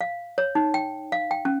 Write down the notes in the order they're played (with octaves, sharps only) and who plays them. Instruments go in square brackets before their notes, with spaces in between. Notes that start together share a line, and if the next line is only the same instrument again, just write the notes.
[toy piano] F5
C#5
D#4
G5
F5
G5
C#4